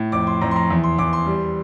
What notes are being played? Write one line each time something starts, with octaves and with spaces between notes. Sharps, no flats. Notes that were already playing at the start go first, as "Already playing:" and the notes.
Already playing: A2
F2 D6
C6
F2 A#5
C6
A#5
E2
C6
E2 D6
C6
G3